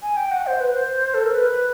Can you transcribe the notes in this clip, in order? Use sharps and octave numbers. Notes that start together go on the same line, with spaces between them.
G#5
G5
F#5
C5
B4
C5
A4
A#4
B4